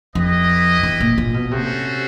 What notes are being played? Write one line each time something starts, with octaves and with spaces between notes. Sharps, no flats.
F2 E4 G4 B4 D#5
E2
A#2
A#2
B2
C3 A3 C#4 F#4 A4 C5